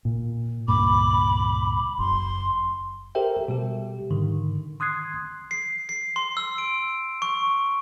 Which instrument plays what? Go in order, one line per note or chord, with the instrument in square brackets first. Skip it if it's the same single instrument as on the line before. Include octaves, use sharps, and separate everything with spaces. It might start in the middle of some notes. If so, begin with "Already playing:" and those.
[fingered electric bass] A#2
[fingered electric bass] C#2 G2 A#2 [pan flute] B5 [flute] D6
[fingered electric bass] F#1 [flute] C6
[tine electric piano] G4 A4 A#4 C5 E5 G5
B2 G3 G4
G#2 D3 D#3
C6 D#6 F#6 G#6 C7
[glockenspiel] C7
C7
C6
E6
D7
C#6